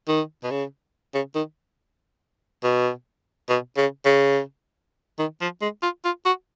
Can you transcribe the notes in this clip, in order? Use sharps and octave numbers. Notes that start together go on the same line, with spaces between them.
D#3
B2
C#3
C#3
D#3
B2
B2
C#3
C#3
D#3
F3
G#3
F4
F4
F#4